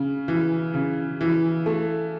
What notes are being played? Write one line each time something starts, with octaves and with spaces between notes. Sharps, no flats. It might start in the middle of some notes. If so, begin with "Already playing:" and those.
Already playing: C#3
E3
C#3
E3
A3